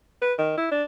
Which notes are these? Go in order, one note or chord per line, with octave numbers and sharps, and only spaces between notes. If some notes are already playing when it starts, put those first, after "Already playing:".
B4
D#3
E4
D4